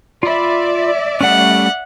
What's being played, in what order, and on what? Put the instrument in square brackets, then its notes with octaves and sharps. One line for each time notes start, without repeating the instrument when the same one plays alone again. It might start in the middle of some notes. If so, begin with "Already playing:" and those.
[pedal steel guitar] F4 B5 [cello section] D5 E5
[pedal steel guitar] G3 A3 C#4 [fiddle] F#5